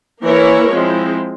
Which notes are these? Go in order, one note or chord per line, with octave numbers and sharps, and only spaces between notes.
E3 A#3 E4 A#4 C#5
F3 G#3 C4 E4